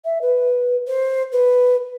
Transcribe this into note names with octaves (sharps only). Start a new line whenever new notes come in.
E5
B4
C5
B4